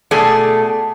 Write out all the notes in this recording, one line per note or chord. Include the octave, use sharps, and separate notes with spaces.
B2 A3 G#4 D5